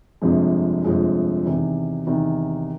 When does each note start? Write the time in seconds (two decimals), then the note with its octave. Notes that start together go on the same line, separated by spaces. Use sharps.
0.22 G1 F2 C3 F3 G#3
0.84 G1 F2 C3 F3 G#3
1.46 E2 C3 D#3
2.07 E2 C3 D#3